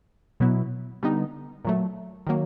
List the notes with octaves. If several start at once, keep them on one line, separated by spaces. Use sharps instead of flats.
B2 F#3 B3 E4
D3 G3 B3 D#4
A#2 F#3 A3
D#3 F#3 A#3